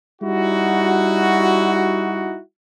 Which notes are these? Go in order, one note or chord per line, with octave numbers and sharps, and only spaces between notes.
G3 D#4 E4 F#4